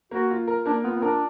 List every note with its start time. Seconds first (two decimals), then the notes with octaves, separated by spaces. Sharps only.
0.11 A#3 F#4
0.31 F4
0.48 A#4
0.66 A#3 D4
0.84 B3 F4
0.96 B3
1.02 D4 A#4